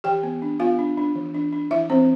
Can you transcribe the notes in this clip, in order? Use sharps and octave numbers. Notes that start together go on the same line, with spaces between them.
E3 G4 G5
B3
D4
B3 F4 F5
D4
D4
E3
D4
D4
E3 E4 E5
E3 C4 C5